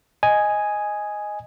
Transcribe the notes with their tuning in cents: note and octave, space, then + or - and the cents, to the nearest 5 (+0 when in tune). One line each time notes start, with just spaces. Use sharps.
D#5 +0 G#5 +0